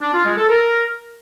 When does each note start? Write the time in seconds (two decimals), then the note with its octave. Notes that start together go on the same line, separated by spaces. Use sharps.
0.01 D4
0.13 F4
0.25 G#3
0.37 A4
0.49 A#4